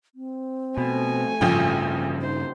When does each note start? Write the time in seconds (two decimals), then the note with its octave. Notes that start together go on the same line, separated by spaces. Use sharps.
0.15 C4
0.78 B2 A3 G#5
1.41 A1 G2 C#3 F3 F4 G5
2.22 D#4 C5